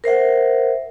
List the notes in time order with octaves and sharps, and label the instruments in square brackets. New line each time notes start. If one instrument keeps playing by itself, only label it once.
[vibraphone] A#4 C5 E5 F#5